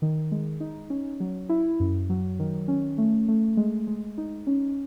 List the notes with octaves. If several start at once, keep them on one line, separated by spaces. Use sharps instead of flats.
D#3
G#3
D#4
C#4
F#3
E4
F#2
F#3
D#3
C#4
A3
A3
G#3
G#3
D#4
C#4